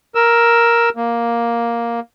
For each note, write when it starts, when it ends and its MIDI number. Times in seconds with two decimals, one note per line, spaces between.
0.15 0.89 70
0.15 0.89 88
0.97 2.00 58